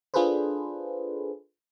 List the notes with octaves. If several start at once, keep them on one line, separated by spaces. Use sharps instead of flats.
D4 F4 G#4 A4 B4 C5